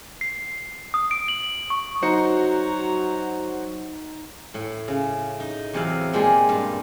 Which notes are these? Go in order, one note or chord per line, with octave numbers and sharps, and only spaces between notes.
C7
D#6
D7
F#7
C#6
F#3 D#4 F#4 C5 C#7
A2
C#3
D#4
E2 C3 F#3 E4 F5
A#2 G#3 G4 G#4 A5
G2